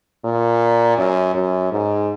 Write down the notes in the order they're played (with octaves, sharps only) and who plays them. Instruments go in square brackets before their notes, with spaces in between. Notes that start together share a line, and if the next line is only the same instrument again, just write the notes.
[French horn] A#2
F#2
F#2
G#2